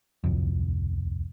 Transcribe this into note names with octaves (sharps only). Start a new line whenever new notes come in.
D1 C2 F2